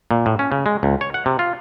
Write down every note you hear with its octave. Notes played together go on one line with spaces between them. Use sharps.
A#2
A2
C#4
C#3
G#3
C#2
C#5
F#5
C3
F4